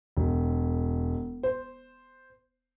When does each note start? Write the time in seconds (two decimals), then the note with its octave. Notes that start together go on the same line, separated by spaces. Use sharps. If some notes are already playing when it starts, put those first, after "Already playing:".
0.17 E1
1.43 C5